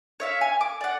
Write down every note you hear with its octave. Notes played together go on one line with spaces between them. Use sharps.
C#5 E5 F5
G#5
D6
D5 F#5